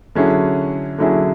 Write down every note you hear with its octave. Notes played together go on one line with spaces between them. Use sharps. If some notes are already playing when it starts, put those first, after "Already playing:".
D3 F#3 C#4 E4 G#4
D3 F#3 C#4 E4 G#4